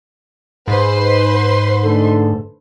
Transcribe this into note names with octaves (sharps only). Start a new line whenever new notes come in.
G#2 B4 C5 C6
D3 A3 A4